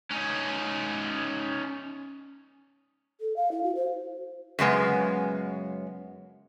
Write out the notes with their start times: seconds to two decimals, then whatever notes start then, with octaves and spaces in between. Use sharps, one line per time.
0.12 C#4 D#4
3.20 A4
3.36 F5
3.51 E4
3.63 F#4
3.75 C5
4.59 F#2 C#3 G#3 B3